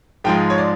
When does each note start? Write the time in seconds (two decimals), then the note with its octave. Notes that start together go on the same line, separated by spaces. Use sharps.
0.24 G#2 F3 G#3 G5
0.50 C#5
0.58 D5